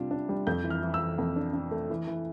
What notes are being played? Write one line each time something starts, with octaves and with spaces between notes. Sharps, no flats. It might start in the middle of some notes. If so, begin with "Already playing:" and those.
Already playing: C3 G3 D4 F4
D4
G3
F2 G6
E3
F6
E3
E6
E3
F2
D4
D4
A3
E3
E3